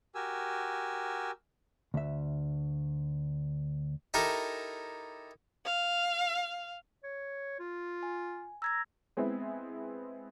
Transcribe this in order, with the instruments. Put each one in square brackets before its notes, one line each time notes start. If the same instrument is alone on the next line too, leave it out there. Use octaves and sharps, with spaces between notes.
[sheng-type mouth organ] F#4 G4 A#4 G#5 E6
[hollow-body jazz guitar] D2 E5
[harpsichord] D#4 E4 G4 A4 A#4
[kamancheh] F5
[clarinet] C#5
F4
[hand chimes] G#5
[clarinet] A#5 [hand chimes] E6 G#6 A#6
[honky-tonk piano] G#3 B3 C4 E4